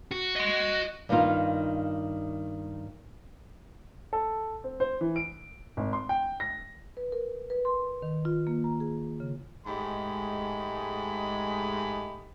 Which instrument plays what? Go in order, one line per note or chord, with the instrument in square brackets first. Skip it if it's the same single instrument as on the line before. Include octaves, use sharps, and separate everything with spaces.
[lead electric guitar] F#4
[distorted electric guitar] D#5 C6
[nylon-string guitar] G2 D#3 A#3 D#4 F4
[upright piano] A4
C4
C5
E3
D7
G#1
C6
G5
A#6
[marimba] B4
A#4
B4
C6
D#3
F4
A#3
A#5
G#4
C#3
[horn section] G#2 G#3 A3 G4 D#5 B5